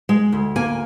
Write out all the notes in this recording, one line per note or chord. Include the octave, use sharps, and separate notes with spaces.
G#3
D2
A#3 G#5